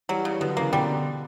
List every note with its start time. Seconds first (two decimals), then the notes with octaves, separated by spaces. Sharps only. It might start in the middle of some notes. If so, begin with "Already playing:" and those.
0.09 E3 F#3 G3
0.25 C#3
0.41 B2 D3 F#3
0.57 C#3 E3 A#3
0.72 B2 D3 G3